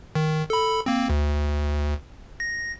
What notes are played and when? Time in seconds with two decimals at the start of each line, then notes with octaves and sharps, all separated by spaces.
0.15 D#3
0.50 A4 B5
0.86 A#3 C4
1.10 D2
2.40 A#6